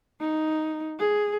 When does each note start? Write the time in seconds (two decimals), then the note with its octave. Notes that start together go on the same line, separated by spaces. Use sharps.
0.20 D#4
0.99 G#4